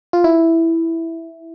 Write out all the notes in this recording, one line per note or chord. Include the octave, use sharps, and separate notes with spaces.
F4
E4